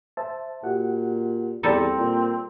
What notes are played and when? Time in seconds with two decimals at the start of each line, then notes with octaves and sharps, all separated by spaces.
0.17 C5 E5 A5
0.63 A#2 F#4 G4 F#5
1.63 E2 G3 C4 A4 A#5
1.98 A#2